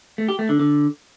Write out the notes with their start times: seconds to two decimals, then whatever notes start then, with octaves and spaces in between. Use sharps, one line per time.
0.18 A3
0.29 G4
0.39 A3
0.49 D3
0.59 D3